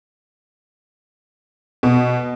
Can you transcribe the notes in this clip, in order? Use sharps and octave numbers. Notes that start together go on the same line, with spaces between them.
B2